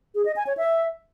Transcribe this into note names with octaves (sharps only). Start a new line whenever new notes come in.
G#4
D#5
G#5
C#5
E5